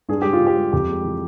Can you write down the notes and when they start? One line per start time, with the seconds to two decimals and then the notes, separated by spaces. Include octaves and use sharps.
0.09 G2 G#4
0.22 G3 G4
0.33 F4
0.40 G2
0.47 G4
0.56 G3
0.73 F2 G4
0.89 G#3
1.04 E3